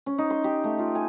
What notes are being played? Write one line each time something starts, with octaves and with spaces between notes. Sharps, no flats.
C#4
D#4
C6
G4
A3
F4
G#5